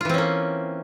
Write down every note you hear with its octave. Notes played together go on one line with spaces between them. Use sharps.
E3 A#3 C4 C#4 F4